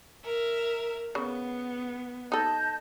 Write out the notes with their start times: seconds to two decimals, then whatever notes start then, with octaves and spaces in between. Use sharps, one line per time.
0.24 A#4 E5
1.15 C#3 B3
2.32 D#4 A4 D#5 A5 G6